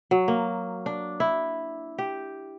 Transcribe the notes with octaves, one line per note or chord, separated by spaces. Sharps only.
F#3
A#3
D4
E4
G4